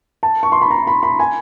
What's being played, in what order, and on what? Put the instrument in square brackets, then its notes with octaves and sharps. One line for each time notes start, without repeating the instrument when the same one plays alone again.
[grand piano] A5
C#6
C6
B5
A#5
B5
B5
G#5